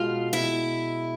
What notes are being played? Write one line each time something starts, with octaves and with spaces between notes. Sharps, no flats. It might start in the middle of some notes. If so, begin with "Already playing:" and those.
Already playing: B2 G#3 F4 F5
E4 E5